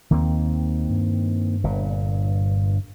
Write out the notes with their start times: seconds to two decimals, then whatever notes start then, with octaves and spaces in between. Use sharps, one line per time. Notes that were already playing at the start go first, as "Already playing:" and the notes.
0.11 D#2 D#3 A#3 C4
0.90 G2
1.64 G1 A#2